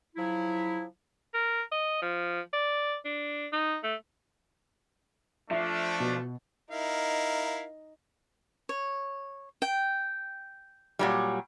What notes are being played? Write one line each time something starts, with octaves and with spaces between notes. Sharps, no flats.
C#3 F3 F#3 E4
A#4
D#5
F3
D5
D4
D#4
A3
F3 A3 D4 E5
B2
D#4 E4 A#4 F5
C#5
G5
A#2 F#3 G3